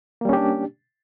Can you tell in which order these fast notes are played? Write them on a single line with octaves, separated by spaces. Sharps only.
A#3 G3 C#4 G4 D4